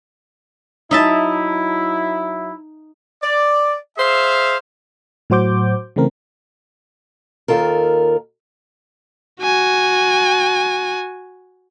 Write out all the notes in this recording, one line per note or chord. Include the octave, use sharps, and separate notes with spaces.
F#3 D#4 E4 E5 A5
D5
G#4 C5 E5 F5
A2 F#3 F#4 C5 D6 G6
C#3 E3 A3 C4 A#4
D#2 D#3 F4 A4 A#4
F#4 G#5